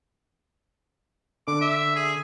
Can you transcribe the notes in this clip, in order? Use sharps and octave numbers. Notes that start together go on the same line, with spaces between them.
D3 D6
E5
G#4